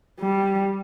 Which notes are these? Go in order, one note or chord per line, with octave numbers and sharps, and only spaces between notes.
G3